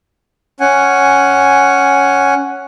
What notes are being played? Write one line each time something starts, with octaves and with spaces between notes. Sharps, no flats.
C#4 F#5 G#5